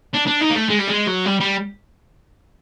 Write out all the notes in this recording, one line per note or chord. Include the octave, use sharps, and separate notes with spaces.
D4
D4
D#4
A#3
A3
G#3
G3
G#3
F#3
G3
G3